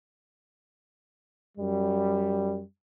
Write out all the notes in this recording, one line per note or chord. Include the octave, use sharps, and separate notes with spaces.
F#2 G3